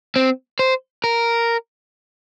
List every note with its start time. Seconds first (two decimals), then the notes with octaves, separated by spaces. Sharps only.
0.16 C4
0.59 C5
1.04 A#4